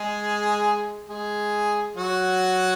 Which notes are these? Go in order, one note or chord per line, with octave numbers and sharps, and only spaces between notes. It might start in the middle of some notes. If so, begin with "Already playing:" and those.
Already playing: G#3 G#4
G#3 G#4
F#3 F#4